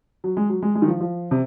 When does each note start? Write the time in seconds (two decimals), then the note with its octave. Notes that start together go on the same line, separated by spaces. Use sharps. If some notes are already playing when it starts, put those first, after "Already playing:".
0.24 F#3
0.37 G#3
0.49 F#3
0.62 G#3
0.75 G#3
0.82 D#3
0.88 F3
1.00 F3
1.31 C3